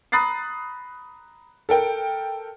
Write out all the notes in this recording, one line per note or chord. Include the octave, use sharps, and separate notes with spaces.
A#5 B5 D#6 F#6 A6 C7
A4 A#4 G5